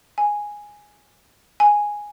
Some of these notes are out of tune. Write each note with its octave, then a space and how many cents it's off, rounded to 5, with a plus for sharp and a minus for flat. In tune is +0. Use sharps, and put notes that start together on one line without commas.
G#5 -5
G#5 -5